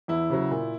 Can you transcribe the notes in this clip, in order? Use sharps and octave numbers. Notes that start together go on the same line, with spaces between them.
E2 E4
C#3 F#3
A#2